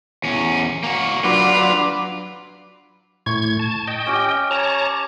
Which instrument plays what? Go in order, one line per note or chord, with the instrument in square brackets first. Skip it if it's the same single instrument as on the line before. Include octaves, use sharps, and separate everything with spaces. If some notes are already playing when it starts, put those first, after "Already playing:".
[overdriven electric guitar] E2 C#4
A#3 F#4
[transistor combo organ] F#3 D4 B4 [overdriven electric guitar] F4
[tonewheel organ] A2 G#6 [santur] C#6
[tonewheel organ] A5
D#5 G5
[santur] C#4 G4
[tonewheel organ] C#5 A5 A#5